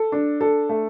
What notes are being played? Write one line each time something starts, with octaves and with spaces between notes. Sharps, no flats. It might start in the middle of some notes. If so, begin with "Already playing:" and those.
Already playing: A4
D4
A4
A3